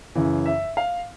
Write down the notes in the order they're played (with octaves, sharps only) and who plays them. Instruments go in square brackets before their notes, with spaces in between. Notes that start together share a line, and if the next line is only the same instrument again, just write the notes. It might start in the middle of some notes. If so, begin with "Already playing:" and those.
[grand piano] F#2 C#3 E3
E5
F5